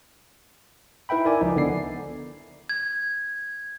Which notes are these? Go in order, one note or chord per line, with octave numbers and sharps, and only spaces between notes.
D#4 E4 B4 E5 G5 B5
E4 A#4 D5 G#5 D6
C#2 F3 D#4
D3 B3 D5 C7
G#6